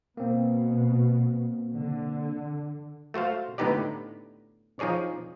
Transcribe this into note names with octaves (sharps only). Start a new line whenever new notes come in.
B2 A#3 C4
D3
A3 F#4 C5 F5
A2 D3 B3 D#4 G4 D5
F3 D#4 G#4 C#5 D5